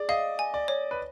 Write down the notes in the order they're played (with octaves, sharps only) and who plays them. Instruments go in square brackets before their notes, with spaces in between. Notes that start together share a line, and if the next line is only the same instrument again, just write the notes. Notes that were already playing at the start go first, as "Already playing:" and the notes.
Already playing: [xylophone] G#4 [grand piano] D5
[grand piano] D#5 [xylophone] F5
[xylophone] G#5
[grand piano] D5
[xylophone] C#5
[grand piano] B4